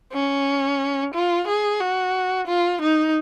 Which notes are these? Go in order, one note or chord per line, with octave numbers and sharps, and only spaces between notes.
C#4
F4
G#4
F#4
F4
D#4